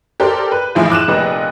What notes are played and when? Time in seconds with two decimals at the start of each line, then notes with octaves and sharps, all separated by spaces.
0.20 G4 A4 A#4 C5 D5
0.52 B4
0.75 A2 E3 F3 G#3 E4
0.90 D6 F#6 D#7 E7
1.08 F1 A#2 B4 D#5